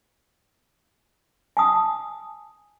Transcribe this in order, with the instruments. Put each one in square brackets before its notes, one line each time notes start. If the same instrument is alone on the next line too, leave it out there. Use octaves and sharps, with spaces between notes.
[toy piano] G#5 A5 D#6